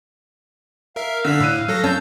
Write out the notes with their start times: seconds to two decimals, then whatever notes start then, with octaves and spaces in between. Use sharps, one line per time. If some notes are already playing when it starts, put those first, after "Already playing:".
0.96 A#4 E5 F5
1.25 D3 E6 B6
1.40 A2 E6 F#6 D#7
1.68 F#3 A4 A#6
1.84 C#4 A5 E6 G6